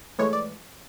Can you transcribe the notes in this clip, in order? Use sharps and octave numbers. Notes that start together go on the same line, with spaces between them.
A2 E3 G#3 C#5
D5